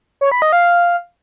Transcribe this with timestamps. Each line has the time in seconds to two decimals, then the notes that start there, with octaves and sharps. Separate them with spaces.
0.21 C#5
0.32 B5
0.42 D#5
0.52 F5